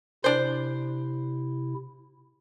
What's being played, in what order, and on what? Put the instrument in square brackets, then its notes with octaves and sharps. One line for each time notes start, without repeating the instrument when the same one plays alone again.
[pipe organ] C3 E4 [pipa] D4 C5